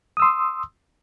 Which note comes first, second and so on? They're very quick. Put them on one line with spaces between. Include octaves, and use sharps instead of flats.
D#6 E6 C6